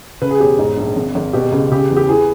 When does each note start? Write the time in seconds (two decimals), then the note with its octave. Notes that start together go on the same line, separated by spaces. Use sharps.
0.22 C#3 B4
0.31 G#4
0.40 E1 G4
0.59 G#2
0.77 A#1
0.96 G#1
1.15 G#1
1.33 B2 G4
1.52 C#2
1.72 C#3 G4
1.90 E2
1.97 G4
2.09 E3 G#4